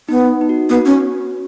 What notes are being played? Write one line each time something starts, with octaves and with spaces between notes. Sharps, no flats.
B3 D#4
D#4
F#4
B3 F#4
C#4